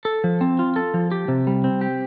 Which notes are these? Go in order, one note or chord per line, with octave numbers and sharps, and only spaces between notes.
A4
F3
C4
F4
A4
F3
G4
C3
G3
C4
G4